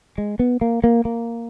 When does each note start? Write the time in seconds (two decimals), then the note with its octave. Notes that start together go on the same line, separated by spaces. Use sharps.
0.18 G#3
0.39 B3
0.61 A#3
0.84 A#3
1.05 A#3